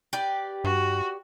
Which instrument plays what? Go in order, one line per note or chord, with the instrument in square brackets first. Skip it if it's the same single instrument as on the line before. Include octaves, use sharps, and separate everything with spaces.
[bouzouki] G4 B4 D5
[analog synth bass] G2 [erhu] F#4